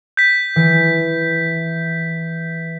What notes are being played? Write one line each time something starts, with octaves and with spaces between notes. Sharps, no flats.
G6 B6
E3